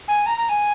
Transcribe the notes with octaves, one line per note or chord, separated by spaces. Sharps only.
G#5
A#5
A#5
G#5